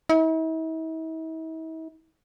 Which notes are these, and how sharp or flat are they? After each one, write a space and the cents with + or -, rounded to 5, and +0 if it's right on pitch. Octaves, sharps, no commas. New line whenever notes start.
E4 -45